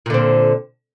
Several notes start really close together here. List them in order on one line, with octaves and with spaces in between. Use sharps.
A#2 D3 C4